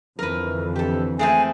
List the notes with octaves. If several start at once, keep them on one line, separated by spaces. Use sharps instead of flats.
F2 D3 E3 A#4 B4
G4 A4
G#3 A3 C4 G#5